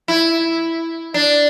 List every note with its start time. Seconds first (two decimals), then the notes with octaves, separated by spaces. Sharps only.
0.08 E4
1.14 D4